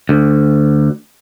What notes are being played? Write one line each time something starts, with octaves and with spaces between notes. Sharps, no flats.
D2